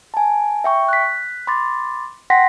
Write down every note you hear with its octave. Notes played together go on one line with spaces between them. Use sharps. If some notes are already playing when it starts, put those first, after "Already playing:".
G#5 A5
E5 G5 C#6
F#6 B6
B5 C6 D6 A6
F#5 G5 C6 A#6 B6